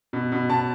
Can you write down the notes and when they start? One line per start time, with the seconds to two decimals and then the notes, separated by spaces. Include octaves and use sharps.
0.13 B2
0.32 B2
0.49 B2 A5